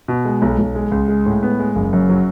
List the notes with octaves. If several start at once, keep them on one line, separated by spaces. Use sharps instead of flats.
B2
G#3
B1
B1
G#3
C#2
G#3
A2
B3
G#3
F#1
F#2
F#3